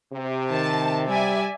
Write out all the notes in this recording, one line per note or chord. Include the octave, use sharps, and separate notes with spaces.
C3
D#3 A5
G3 D5 E5 G#5